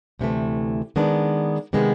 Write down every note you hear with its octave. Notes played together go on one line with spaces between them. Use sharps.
D2 C3 E3 A3
D#3 G#3 B3 D4
C3 D#3 G#3 B3